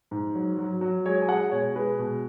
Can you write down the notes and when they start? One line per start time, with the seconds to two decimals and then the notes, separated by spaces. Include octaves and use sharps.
0.11 G#2
0.35 F#3
0.58 F#3
0.81 F#3
1.06 G#3 C#5
1.22 G#5
1.29 G#3 C#5 F#5
1.52 B2 C#5
1.76 G#3 B4
1.99 B2